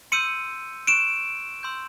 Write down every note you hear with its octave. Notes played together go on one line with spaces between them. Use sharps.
C6 E6 G6 C#7 D#7
C#6 F#6 D7 E7
C6 E6 G6